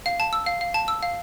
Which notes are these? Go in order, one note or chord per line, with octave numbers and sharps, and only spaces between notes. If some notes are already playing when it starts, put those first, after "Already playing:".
F5
A5
E6
F5
F5
A5
E6
F5